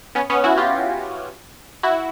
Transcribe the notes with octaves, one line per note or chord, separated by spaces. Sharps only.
B3 C#4
B3 C#4
E4 F#4
F4 G4
E4 F#4